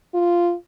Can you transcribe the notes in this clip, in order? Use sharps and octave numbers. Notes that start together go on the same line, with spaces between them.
F4